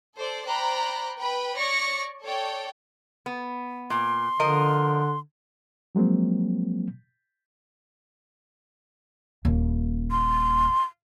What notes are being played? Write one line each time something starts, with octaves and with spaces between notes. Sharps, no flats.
A4 C5 D5
C5 D5 G5 A#5 B5 F#6
B4 G5 B5
C#5 D5 C#6 A#6 C#7
A4 C#5 D5 G5
B3
A#2 C6
D3 F3 A#4 D#5
F3 F#3 G#3 A#3 C4
D#1 A#3
C6